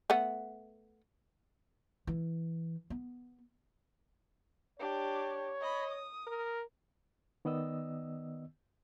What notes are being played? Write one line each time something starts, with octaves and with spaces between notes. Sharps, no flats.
A3 B3 F#5
E3
B3
D4 G4 C#5
D#5 B5
D#6
A#4
D#3 B3 D5 D#5 E6